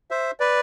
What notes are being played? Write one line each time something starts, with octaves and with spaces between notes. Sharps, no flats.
C5 E5
B4 D5